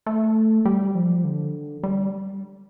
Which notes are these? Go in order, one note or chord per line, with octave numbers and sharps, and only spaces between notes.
A3
G3
F3
D3
G3